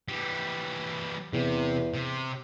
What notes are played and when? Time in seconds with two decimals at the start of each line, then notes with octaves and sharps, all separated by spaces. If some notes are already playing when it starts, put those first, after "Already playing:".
0.08 E3 G3
1.33 E2 C3
1.94 C3